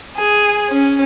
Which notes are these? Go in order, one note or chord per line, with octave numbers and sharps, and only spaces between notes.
G#4
C#4